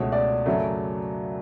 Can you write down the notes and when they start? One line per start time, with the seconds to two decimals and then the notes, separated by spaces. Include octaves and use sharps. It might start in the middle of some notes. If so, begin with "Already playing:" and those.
Already playing: C#2 B2 A3 C#5
0.12 D5
0.46 F#2 C#3 F#3 A3